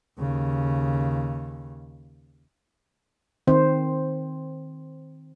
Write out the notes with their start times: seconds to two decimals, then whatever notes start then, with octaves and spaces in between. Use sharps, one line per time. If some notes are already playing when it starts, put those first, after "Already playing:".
0.18 D#2 C#3
3.47 D#3 C4 C5